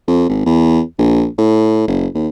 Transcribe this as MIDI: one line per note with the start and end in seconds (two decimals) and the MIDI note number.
0.08 0.27 41
0.29 0.45 32
0.46 0.81 40
0.99 1.26 34
1.38 1.83 45
1.88 2.07 30
2.15 2.28 39